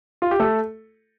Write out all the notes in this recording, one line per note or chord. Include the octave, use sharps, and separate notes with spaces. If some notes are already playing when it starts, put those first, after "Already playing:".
F4
G4
A3 A4